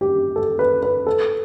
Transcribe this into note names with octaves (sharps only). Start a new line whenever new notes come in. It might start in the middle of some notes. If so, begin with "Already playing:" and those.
G4
A4
B4
B4
A4